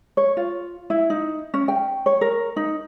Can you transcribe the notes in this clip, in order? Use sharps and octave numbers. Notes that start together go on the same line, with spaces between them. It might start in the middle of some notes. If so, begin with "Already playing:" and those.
C#5
F4
E4
D#4
C#4
G5
C#5
A#4
D#4